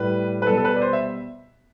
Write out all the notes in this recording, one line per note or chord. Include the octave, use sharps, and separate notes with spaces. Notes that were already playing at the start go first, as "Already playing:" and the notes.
Already playing: A2 G3 B4
B4
B2 G3 A4
A4
B4
D5
C5
E5